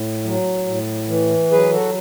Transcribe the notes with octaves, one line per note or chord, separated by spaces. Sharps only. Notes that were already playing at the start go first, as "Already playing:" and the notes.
Already playing: A2
F#3
A2
E3
F#3 G#4 B4
F#4 A4